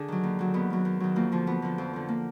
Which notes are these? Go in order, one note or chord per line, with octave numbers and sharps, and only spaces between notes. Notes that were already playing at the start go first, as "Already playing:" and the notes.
Already playing: D3 D4 G#4
D#3 F#3
D#2
D#3 F#3
D#2 B3
D#3 F#3
D#2
D#3 F#3
F2 A#3
D3 F3
F2 B3
D3 F3
F2
D3 F3
A#3